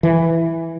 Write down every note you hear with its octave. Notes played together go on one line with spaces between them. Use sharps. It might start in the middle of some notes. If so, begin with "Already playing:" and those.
E3